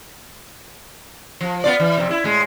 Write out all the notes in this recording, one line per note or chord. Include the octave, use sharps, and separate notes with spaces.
F3
B3 F4 D5
E3
F2 C3
E4
A2 G#3